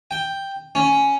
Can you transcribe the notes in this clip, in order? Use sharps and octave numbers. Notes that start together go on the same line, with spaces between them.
G5
C#4